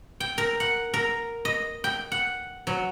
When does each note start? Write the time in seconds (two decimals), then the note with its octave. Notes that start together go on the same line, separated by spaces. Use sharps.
0.20 G5
0.38 A#4
0.60 F#5
0.94 A#4
1.45 D#5
1.84 G5
2.12 F#5
2.67 F#3